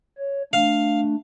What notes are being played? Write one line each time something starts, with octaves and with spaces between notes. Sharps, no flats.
C#5
A3 D4 F5